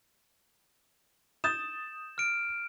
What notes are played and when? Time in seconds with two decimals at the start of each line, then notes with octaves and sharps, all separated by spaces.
1.44 D#6 G6 A6 E7
2.18 F6 D7